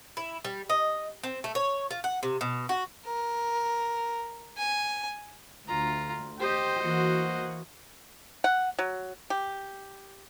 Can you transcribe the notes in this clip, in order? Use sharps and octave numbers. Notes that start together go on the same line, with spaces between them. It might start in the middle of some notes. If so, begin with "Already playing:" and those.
E4
G3
D#5
C4
A3
C#5
F4
F#5
C3
B2
F#4
A#4
G#5
D2 F4 A#5
G4 C5 D#5
E3 A#3 F#4
F#5
F#3
G4